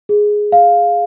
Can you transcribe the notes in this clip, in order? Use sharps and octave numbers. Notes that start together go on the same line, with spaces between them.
G#4
F5